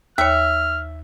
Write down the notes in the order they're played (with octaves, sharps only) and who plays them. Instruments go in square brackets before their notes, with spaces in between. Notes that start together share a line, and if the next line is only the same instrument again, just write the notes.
[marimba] D#2 C#5 [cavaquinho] E5 [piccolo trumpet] F6